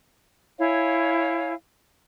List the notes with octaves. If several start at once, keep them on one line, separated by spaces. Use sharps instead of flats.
E4 C#5 F5 G#5